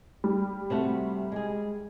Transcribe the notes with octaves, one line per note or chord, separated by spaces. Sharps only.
G3
C3 A3 F#4
G#3 G#4